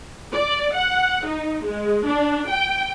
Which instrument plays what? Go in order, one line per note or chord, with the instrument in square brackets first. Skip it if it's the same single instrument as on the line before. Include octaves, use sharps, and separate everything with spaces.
[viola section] D5
F#5
D#4
G#3
D4
G5